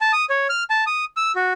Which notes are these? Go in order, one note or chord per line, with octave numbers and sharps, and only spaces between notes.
A5
D#6
C#5
F6
A5
D#6
E6
F#4